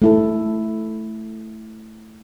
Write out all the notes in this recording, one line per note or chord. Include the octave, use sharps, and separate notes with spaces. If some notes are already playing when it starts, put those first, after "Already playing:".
A3 E4 A4